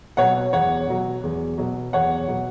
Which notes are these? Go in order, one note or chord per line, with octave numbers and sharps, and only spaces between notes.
B2 F#3 C#5 F#5
E2 C#5 F#5
B2 F#3
E2
B2 F#3
E2 C#5 F#5
B2 F#3